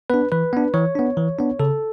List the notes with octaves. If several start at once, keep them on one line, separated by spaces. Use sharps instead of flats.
B3 D4 B4
E3 B4
B3 D4
E3 C#5
B3 D4
E3
B3 D4
C#3 A4